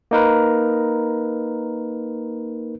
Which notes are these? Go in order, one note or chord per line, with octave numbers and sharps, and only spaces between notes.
A#3 D#4 A#4 B4